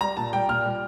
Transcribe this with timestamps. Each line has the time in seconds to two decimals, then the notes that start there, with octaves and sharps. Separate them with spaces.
0.01 G3 A#5
0.17 A#2 A5
0.33 G3 G5
0.48 A#2 F6
0.65 G3